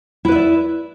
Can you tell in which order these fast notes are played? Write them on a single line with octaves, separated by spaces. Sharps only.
E4 B4 E5 D5